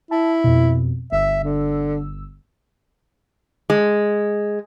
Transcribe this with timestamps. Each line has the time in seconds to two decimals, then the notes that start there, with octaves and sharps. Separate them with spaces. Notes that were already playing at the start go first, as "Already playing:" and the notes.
0.11 E4 A5
0.44 F2 B2
1.12 G1 E5 E6
1.44 D3
3.70 G#3